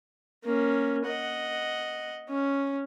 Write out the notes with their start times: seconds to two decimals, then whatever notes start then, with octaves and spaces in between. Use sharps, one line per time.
0.44 A#3 C#4
1.06 D#5 F#5
2.29 C#4